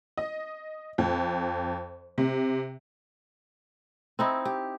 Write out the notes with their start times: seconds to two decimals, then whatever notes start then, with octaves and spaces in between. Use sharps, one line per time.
0.18 D#5
0.98 F2
2.18 C3
4.19 C4 D#4 E4
4.45 G4